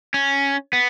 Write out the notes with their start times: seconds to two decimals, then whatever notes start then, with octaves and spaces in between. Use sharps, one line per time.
0.14 C#4
0.73 B3